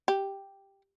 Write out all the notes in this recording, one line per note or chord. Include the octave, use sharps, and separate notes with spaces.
G4